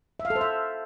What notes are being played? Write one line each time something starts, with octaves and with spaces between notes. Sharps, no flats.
E5
F5
A4
C5
E5